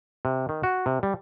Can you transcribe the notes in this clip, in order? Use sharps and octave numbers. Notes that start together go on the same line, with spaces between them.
C3
D#3
F#4
C3
G3